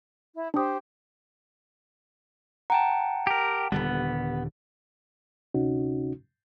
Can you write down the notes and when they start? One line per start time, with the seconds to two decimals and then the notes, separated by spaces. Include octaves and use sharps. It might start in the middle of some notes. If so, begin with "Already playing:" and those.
0.35 E4
0.54 D4 G4 C5 D#6
2.70 F#5 G5 A5 A#5
3.27 G4 A#4
3.72 D#1 D3 G3 B3
5.55 D2 C3 C#4 D#4 F#4